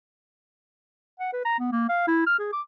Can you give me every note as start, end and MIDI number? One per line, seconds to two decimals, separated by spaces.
1.20 1.31 78
1.33 1.44 71
1.45 1.56 82
1.59 1.71 59
1.72 1.86 58
1.89 2.04 77
2.08 2.22 64
2.27 2.38 89
2.39 2.50 68
2.53 2.61 86